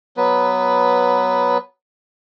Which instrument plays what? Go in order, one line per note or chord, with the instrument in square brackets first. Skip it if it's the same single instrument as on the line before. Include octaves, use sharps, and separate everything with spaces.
[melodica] F#3 B3 B4